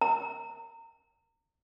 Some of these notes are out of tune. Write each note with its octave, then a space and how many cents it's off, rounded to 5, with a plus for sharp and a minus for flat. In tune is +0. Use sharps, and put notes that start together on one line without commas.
A#5 -30